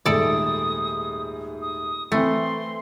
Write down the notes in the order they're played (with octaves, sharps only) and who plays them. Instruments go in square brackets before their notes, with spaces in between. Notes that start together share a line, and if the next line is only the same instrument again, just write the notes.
[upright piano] D#1 G#2 A3 [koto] A4 D5 [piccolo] D#6
[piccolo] D#6
[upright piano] E3 C4 [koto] A3 [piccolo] C6